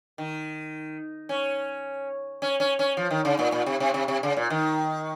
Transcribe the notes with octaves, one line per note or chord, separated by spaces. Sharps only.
D#3
C#4
C#4
C#4
C#4
F3
D#3
C#3
A#2
A#2
C3
C3
C3
C3
C#3
A#2
D#3